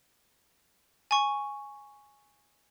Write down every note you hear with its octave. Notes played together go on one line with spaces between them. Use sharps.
G#5 C#6